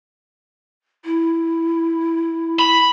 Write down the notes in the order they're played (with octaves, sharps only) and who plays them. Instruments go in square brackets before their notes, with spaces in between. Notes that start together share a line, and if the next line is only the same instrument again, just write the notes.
[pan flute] E4
[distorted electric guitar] B5